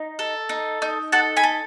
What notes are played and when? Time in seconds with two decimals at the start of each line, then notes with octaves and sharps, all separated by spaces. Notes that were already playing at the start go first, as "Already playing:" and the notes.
Already playing: D#4
0.19 A4
0.49 D#4
0.82 D#4
1.12 A4 F#5 A5
1.37 G#5 B5
1.43 A4